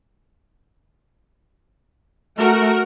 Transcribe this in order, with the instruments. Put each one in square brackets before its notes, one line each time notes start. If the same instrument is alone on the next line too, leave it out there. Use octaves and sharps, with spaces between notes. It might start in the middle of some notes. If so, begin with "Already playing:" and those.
[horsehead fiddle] A3 [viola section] F#4 A#4